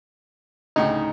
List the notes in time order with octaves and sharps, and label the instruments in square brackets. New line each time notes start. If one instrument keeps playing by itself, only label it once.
[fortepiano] D2 A2 C#3 [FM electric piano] D#4